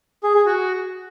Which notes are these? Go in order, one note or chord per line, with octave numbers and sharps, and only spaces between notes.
G#4
G#4
F#4